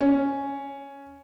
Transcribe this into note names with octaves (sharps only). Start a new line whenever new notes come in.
C#4